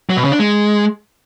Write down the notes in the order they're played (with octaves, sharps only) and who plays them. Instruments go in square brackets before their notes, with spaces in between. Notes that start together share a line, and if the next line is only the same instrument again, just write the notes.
[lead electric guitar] F#3
B2
C#3
D4
G#3